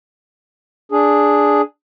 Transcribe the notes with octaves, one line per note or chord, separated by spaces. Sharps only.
D4 G#4